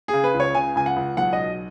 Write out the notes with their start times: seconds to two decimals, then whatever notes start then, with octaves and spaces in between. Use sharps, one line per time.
0.08 G#4
0.13 C#3
0.24 B4
0.34 C#2
0.40 C#5
0.55 C#3 G#5
0.75 C#2 G#5
0.86 F#5
0.96 C#2
1.17 B1 F#5
1.33 B2 D#5